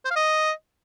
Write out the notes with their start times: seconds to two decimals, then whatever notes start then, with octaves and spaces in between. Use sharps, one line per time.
0.05 C5
0.10 F5
0.16 D#5